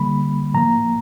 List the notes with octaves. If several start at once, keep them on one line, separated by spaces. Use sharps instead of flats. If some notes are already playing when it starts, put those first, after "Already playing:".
Already playing: D3 G3 A#3 B5
A2 F3 A#3 A#5